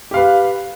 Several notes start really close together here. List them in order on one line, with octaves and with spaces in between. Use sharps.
G4 F5 B4